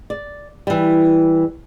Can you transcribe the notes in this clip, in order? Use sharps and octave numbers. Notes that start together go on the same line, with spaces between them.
D5
E3 G3